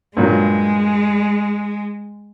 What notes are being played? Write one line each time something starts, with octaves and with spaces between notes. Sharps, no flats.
G2 A#2 F#3 G#3